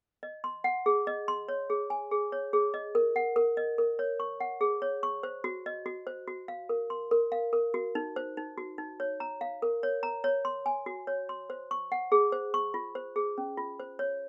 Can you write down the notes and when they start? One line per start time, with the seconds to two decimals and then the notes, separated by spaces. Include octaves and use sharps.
0.23 D#5
0.44 C6
0.64 F#5
0.86 G#4
1.07 D#5
1.28 C6
1.48 C#5
1.70 G#4
1.90 G#5
2.11 G#4
2.32 C#5
2.53 G#4
2.74 D#5
2.95 A#4
3.16 F#5
3.36 A#4
3.57 D#5
3.78 A#4
3.99 C#5
4.20 C#6
4.40 F#5
4.61 G#4
4.82 C#5
5.03 C#6
5.23 C5
5.44 F#4
5.66 D#5
5.86 F#4
6.07 C5
6.27 F#4
6.48 F5
6.69 A#4
6.90 C6
7.11 A#4
7.32 F5
7.53 A#4
7.74 F#4
7.95 D#4
8.16 C5
8.37 D#4
8.58 F#4
8.78 D#4
9.00 C#5
9.20 A#5
9.41 F5
9.62 A#4
9.83 C#5
10.03 A#5
10.24 C#5
10.45 C6
10.66 G#5
10.86 F#4
11.07 C#5
11.29 C6
11.50 C5
11.71 C#6
11.92 F#5
12.12 G#4
12.32 C5
12.54 C#6
12.74 F4
12.95 C5
13.16 G#4
13.38 C#4
13.57 F4
13.80 C5
13.99 C#5